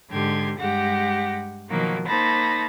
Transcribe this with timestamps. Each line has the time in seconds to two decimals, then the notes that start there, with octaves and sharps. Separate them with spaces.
0.10 G#2 D3 G4 C6 G#6
0.59 G2 G#3 G4 F#5 A#6
1.69 B2 D#3 F3 F#3 A#3
2.07 A#3 D#4 C5 A5 B5 A#6